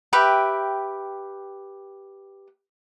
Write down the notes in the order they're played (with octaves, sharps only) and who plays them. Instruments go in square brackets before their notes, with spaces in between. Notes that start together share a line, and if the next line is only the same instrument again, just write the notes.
[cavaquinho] G4 B4 E5 G5